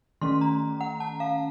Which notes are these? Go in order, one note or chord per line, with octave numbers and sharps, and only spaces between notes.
D#3 A3 C#4 C6
A#5
F#5
A5
F5